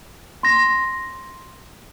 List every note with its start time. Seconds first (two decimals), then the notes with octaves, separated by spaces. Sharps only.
0.43 C6 A#6